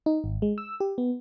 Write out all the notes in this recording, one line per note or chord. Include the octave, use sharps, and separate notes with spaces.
D#4
G#1
G#3
E6
G4
B3